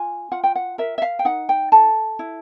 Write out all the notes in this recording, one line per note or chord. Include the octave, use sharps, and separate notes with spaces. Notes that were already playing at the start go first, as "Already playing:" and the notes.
Already playing: F4 G#5
F4 F#5
G5
F#5
A#4 E5
E5
F5
G5
D#4 F#5
G5
A4 A5
E4